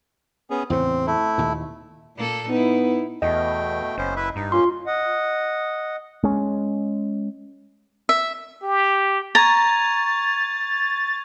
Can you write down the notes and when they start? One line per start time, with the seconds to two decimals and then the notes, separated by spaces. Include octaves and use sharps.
0.50 B3 C#4 G#4
0.70 E2 A2 C#3 C4
1.07 A3 E4
1.38 D#2 A#2
2.16 A#2 A#3 A4
2.50 B3 D#4 E4
3.22 E2 B2 A3 D#5 G5
3.98 F#1 B3 C#4 C5
4.16 E4 B4 E5
4.36 G2 D#4
4.52 A#3 C#4 F4 C6
4.86 D#5 F#5
6.23 G#3 C#4
8.09 E5
8.63 G4
9.35 A#5 C#6 G#6 A6 F7